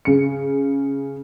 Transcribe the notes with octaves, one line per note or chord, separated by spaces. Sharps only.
C#3 C#7